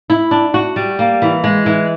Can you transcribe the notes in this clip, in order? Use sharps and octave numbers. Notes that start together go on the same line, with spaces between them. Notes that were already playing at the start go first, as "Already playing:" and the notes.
E4
D4
F#4
G3
A#3
E3
G#3
E3